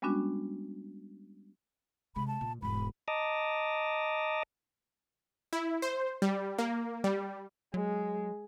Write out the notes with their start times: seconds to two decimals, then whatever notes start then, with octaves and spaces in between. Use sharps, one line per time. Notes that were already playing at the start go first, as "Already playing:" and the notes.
0.02 G3 G#3 B3 C#4 D4 F#4
2.16 C3 G#3 B5
2.28 A5
2.41 A#2
2.62 E1 G#2 B5
3.08 D#5 A5 A#5 D6 D#6
5.53 E4
5.82 C5
6.22 G3
6.58 A#3
7.04 G3
7.74 F#3 G#3